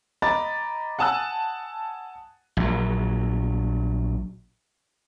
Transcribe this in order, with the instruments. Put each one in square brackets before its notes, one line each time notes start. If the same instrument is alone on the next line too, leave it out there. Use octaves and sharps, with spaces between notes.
[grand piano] D#5 A#5 B5 D6 A6
F#5 G#5 A5 D#6 E6 F#6
[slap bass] A#1 F#3